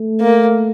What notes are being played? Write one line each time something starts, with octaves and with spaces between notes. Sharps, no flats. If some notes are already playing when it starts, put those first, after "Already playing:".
Already playing: A3
A#3